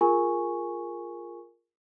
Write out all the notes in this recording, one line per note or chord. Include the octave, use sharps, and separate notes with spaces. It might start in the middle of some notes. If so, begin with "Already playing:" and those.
F4 G#4 A#4 G#5 C#6